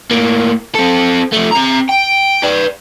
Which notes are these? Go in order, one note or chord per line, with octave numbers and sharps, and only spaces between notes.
A2 A#3
C4 A4
F3 A3
C4 A#5
G5
B4 D5